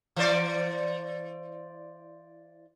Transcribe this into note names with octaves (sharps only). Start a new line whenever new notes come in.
E3 C5 D5